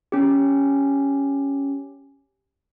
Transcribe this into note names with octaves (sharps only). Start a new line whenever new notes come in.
C#4 G4